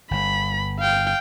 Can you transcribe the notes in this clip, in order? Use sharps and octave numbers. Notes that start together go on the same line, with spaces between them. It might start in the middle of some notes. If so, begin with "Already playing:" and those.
G1 B5
F5 G5